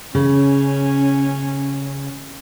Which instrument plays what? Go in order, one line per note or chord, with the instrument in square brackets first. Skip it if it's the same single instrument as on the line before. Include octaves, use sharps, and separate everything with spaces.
[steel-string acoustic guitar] C#3 [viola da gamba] C#4